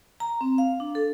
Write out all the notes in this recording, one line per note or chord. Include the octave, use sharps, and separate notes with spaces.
A#5
C4
F5
D4
A4